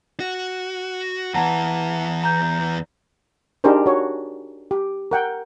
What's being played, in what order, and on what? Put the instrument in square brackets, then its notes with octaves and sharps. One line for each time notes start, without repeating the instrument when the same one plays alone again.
[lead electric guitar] F#4
[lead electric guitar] E2 E3 [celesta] F#5 A5 A#5
[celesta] A#5 G6
[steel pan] D4 D#4 G4 G#4 A#4 C5
F#4 C#5
G4
A#4 F#5 G5